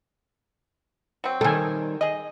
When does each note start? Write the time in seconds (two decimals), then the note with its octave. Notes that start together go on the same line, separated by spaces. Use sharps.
1.24 F#3 C4
1.41 D#3 G3 A4 G#5
2.01 G#4 D#5